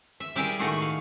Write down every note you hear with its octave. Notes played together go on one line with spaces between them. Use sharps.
E5
G3 E4 G4 G#4 A#4
A2 D#3 A3 D#4 F#4 G#4
F5